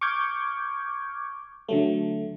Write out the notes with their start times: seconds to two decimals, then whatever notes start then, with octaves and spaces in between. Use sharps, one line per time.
0.01 C#6 D6 F6 G6 G#6
1.69 D3 F#3 A3